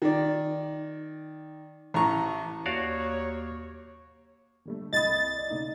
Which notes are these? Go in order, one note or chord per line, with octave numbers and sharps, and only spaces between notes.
D#3 D5
A1 A#5 C#6
D#2 F#4 C#5 D5 F5
D3 G3 A3
C2 D#5 B5 D#6 A6
D5
C#3 A3 D#4